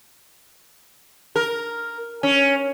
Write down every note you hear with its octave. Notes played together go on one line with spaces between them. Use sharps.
A#4
C#4